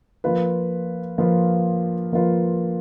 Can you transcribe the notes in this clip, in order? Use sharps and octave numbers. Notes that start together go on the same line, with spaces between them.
F3 A#3 F4 B4
F3 A#3 F4 B4
F3 A#3 F4 B4